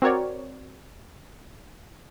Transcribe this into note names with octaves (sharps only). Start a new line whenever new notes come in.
C4 F#4 A#4 C#5 D5